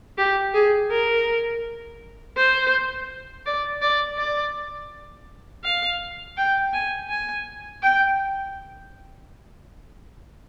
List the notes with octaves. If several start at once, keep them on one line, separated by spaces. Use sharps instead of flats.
G4
G#4
A#4
C5
D5
D5
D5
F5
G5
G#5
G#5
G5